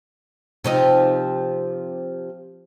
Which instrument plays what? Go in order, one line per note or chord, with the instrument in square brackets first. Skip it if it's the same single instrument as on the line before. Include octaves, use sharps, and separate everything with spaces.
[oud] C3 F3 D#4